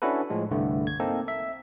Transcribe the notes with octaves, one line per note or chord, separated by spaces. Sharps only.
C#4 D4 E4 F#4 A4 B4
A2 F3 G#3
C2 G2 D3 A3
G#6
A#3 C4 D#4 A4
E5